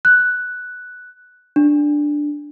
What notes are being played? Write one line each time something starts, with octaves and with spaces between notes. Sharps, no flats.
F#6
D4